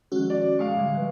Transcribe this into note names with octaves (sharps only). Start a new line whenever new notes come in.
D#3 F3 G#3 C#4 F#4
D5
G#3 F5 C#6 D6
A2 D3 G3
F3 B4